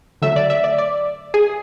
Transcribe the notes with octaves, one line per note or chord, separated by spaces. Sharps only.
D3 F#3 A3 E5
D5
E5
D5
D5
G#4